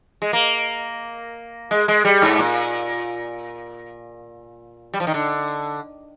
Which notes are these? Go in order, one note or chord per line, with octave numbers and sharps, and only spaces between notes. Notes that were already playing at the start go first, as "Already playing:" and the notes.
G#3
A#3
G#3
G#3
G3
G#2
A#2
G3
F3
D#3
D3